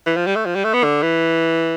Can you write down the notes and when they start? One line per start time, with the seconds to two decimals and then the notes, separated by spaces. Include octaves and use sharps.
0.06 E3
0.17 F3
0.26 G3
0.36 A3
0.45 F3
0.55 G3
0.64 A3
0.74 B3
0.84 D3
1.02 E3